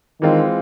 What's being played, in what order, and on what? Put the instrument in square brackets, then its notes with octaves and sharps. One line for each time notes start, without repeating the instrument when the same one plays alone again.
[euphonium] D#3 [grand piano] E3 G#3 C4 F4